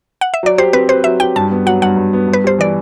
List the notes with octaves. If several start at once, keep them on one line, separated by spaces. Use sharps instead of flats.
F#5
E5
F#3 D5
G4 C5
C4 B4
B4 C5
F#3 E5
G4 G5
G2 A5
B3
F#3 F#5
G2 F#5
G2
B3
G2
B4
G3 C5
E3 D5